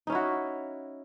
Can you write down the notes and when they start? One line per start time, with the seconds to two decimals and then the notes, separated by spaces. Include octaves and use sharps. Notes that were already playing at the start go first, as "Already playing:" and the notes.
0.07 D#4
0.10 C#4
0.12 E4
0.15 F#4